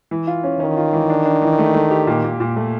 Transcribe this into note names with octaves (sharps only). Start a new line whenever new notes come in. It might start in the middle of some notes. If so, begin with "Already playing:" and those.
E3
F4
C#4
D#3 C#4
F4
E3
D4
D4
E3
A3
A3
G4
A#2
A#2
A#2
A3